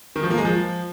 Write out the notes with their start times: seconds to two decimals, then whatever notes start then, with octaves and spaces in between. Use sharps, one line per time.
0.16 D#3
0.23 F3
0.30 A#3
0.38 G#3
0.45 F3